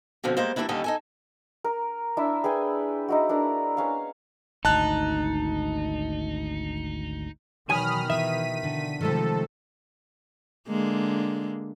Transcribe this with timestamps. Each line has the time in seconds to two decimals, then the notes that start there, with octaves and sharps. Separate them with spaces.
0.24 B2 D3 F3 C4
0.37 G3 G#3 A#3 C5
0.56 E3 F#3 G3 A#3 D4 E4
0.69 D#2 D3 G3 C#4 A4 D#5
0.84 D#4 A4 G#5
1.64 A#4
2.17 D4 E4 E5
2.44 G#4 B4 G5 G#5
3.09 D#4 E4 F#4
3.29 D4 E4 A#4
3.77 B3 C#4 F5
4.65 G#1 D2 D#4 A5 F#6
7.69 B1 E2 B2 D#3 G#5 B5 D#6 F6
8.10 E3 E5 B6 D#7
8.63 D3
9.01 C3 D#3 F3 G#3 A3 A4
10.68 D3 G#3 A#3